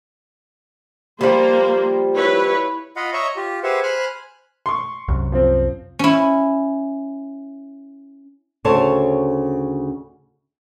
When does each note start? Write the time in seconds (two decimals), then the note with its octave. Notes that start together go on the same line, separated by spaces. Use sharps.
1.21 F3 G3 A#3 C5
2.16 E4 B4 C#5
2.96 F4 D#5 F5 F#5 B5
3.13 C#5 D#5 E5 A#5 C#6
3.36 F4 G4
3.63 G4 G#4 B4 C5 E5 F#5
3.83 C5 G#5 B5 F6 F#6
4.66 C6 C#6
5.08 C2 F#2
5.32 F3 C4
5.99 C#4 E4
8.65 D2 C#3 A4 C5 C#5 A5